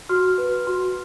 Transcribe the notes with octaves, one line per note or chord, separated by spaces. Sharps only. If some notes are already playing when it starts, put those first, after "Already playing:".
F#4 F6
B4
F#4